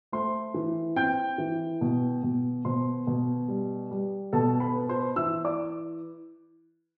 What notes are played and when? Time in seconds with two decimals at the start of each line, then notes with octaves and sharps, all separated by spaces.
0.12 A3 C5 C6
0.54 E3
0.96 C4 G5 G6
1.38 E3
1.81 B2
2.23 B2
2.65 B2 C5 C6
3.07 B2
3.48 G3
3.91 G3
4.33 B2 A4 A5
4.60 B4 B5
4.75 B3
4.89 C5 C6
5.16 E3 E5 E6
5.44 D5 D6